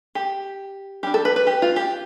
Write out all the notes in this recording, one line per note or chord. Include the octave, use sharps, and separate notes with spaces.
G4
G3 D4 G4
A4
B4
B4
G4
F4
G4